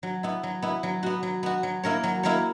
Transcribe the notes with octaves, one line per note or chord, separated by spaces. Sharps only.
F#3
B3 E4
F#3
B3 E4
F#3
B3 F#4
F#3
B3 F#4
F#3
A#3 E4 A#4 C#5
F#3
A#3 E4 A#4 C#5